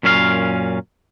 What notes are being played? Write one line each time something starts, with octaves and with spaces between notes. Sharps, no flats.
F#2 A#2 C#4 E4 F5